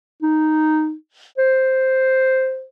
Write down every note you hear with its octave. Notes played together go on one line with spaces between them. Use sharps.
D#4
C5